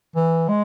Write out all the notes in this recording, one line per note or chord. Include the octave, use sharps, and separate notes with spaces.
E3
G#3